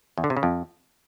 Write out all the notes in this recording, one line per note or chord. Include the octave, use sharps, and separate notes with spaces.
E2
D3
C3
C#3
F2